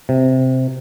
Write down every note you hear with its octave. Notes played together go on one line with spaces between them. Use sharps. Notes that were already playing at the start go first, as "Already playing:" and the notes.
C3